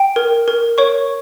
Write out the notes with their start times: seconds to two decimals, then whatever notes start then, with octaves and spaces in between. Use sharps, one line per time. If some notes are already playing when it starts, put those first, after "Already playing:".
Already playing: G5
0.16 A#4
0.48 A#4
0.78 C#5 C#6